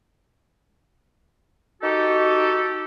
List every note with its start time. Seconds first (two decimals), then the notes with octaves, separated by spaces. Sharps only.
1.82 D#4 F#4 G4 A4